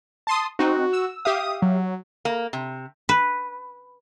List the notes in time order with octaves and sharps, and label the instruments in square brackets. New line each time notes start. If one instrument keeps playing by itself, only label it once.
[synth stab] A5 C6 D#6
[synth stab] C4 D#4 [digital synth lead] F#4
[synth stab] E6
[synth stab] G4 E5 F5 [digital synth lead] D#6
[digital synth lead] F#3
[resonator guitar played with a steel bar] A#3
C3
[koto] B4